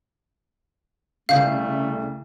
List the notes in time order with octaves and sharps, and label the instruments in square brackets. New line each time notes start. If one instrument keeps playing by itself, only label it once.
[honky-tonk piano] C2 C#3 [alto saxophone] A3 [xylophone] F5 G6